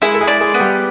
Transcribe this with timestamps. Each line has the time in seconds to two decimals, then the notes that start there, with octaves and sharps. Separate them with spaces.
0.02 G#3 E4 G#4
0.14 A4
0.21 G#3 G#4
0.27 D5
0.41 G#3 G#4
0.54 B3
0.60 G3 G4